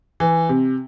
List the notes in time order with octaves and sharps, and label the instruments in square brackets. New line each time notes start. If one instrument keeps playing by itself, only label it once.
[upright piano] E3
C3